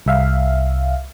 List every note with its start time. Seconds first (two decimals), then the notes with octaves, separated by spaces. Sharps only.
0.06 C2 E5 F5